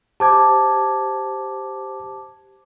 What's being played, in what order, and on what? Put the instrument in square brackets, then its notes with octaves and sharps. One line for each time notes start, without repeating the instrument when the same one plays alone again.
[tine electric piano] G4 C5 [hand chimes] A5 D6 G#6